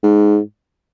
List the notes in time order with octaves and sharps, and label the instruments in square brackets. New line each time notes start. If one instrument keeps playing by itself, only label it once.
[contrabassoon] G#2